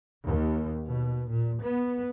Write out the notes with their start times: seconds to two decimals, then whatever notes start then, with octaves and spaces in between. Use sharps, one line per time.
0.25 D#2
0.87 B2
1.30 A#2
1.63 B3